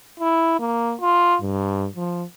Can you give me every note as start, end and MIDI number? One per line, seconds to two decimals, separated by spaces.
0.20 0.55 64
0.59 0.94 58
1.01 1.36 65
1.41 1.88 43
1.96 2.24 53